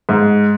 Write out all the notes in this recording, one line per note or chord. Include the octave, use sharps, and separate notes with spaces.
G#2